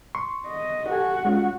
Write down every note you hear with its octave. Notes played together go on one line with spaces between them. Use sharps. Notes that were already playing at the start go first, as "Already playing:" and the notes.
C6 C#6
D#5
F#4 G4 A4 G#5
G#3 C#4 F4